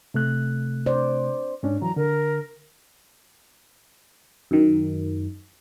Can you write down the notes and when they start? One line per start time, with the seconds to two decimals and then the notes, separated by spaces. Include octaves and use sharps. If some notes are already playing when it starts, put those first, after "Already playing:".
0.14 C3 A3 F#6
0.86 C5 D5
1.63 G#2 C#4 D4
1.82 E3 F#3 A#5
1.96 D3 A#4
4.51 F#2 D#3